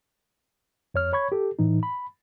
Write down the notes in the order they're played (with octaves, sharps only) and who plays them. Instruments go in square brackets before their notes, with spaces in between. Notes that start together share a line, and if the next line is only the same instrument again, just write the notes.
[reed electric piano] F2 C#5 F6
C#5 B5 C#6 G#6
G4 A4
A2 E3 D#4
B5